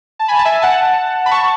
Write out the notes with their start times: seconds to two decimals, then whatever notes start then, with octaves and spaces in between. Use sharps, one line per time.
0.19 A5
0.28 G#5 B5
0.39 A5
0.45 E5 G#5
0.62 F#5 A5
1.26 B5
1.31 A5 C#6